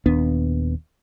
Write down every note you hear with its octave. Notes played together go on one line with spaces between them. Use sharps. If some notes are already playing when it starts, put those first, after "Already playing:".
D#1 D#2 B3 D4